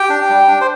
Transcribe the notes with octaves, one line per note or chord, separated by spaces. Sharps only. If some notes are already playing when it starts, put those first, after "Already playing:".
Already playing: G4 G5
D4
G3
D4
C5